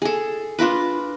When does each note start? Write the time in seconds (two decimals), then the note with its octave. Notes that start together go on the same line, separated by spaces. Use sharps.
0.02 G#4 A4
0.59 D4 F4 A#4 B4